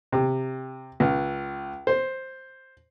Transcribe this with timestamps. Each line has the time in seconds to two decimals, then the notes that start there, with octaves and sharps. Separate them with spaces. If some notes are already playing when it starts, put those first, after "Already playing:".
0.13 C3
1.00 C#2
1.87 C5